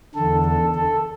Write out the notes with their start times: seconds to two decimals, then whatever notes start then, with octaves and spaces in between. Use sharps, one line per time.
0.15 E2 D3 A4
0.44 A4
0.74 A4